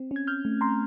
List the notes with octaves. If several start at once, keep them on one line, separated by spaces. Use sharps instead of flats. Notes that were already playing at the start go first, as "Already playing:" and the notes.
Already playing: C4
C#4
G#6
F6 G6
A3
A#5 C6